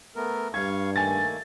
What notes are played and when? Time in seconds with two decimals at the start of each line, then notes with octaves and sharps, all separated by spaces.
0.16 A3 B3 A#4
0.54 G2 G3 F5 C#6 G#6
0.96 D#3 A3 A#3 G#5 A6